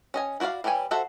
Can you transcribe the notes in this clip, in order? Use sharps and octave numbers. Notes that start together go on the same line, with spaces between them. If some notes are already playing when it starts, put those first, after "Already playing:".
C#4 D#5 G#5
E4 F#4 C#5 D5 F5
E3 G3 G4 C#5 G#5
F#4 A4 C5 E5 F#5